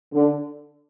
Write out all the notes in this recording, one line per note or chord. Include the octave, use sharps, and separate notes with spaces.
D3